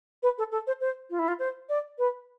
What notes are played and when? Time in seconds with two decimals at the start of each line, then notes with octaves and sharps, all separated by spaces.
0.23 B4
0.38 A4
0.52 A4
0.67 C5
0.81 C5
1.10 F4
1.19 E4
1.28 F4
1.39 C5
1.69 D5
1.99 B4